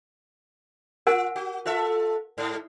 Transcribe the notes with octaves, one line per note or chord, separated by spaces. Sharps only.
F4 A#4 F#5 G#5
F#4
F4 A4 E5
G#2